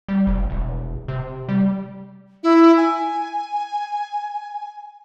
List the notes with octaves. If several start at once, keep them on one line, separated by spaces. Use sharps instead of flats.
G3
F1
E1
C3
G3
E4
G#5